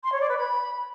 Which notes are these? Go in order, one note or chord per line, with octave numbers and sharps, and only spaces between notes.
C6
C#5
D5
B4
B5